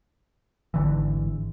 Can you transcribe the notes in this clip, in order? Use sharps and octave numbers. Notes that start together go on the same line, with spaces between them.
G#1 D3 E3